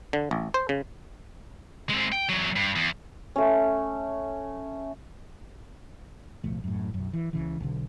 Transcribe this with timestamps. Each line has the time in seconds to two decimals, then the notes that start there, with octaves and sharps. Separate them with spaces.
0.13 D3
0.31 A1
0.54 C5
0.69 C#3
1.90 G#3 C4
2.12 G5
2.29 E2 F#3
2.56 G2
2.76 E2
3.36 A3 C#4
6.44 D1 B1 F3 A3
6.64 F#2 A2
6.94 B1 F#2
7.13 E3
7.33 C#2 C#3 E3
7.60 B1 D3